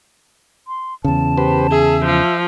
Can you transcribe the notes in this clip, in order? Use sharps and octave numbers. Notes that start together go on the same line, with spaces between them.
C6
E2 C#3 A5
G4 B4 C5
G#4 E5
F3